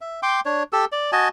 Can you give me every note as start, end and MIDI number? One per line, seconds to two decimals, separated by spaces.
0.01 0.20 76
0.23 0.40 79
0.23 0.40 84
0.23 0.40 86
0.45 0.63 62
0.45 0.63 73
0.73 0.85 67
0.73 0.85 69
0.73 0.85 88
0.92 1.11 74
1.12 1.28 66
1.12 1.28 75
1.12 1.28 80
1.12 1.28 81